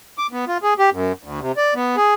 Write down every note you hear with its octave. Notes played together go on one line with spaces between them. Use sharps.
D6
B3
F4
G#4
G4
F#2
D2
C3
D5
B3
G#4